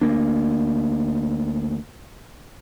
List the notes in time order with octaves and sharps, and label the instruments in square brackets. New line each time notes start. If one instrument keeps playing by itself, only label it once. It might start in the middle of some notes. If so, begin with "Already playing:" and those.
[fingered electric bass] D2 A#3 D4